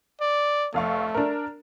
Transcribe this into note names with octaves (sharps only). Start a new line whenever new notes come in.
D5
F1 A3 F5 C#6
D4 A#4